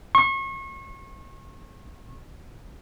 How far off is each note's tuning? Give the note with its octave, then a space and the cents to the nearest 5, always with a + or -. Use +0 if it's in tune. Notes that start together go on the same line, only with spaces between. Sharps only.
C#6 -35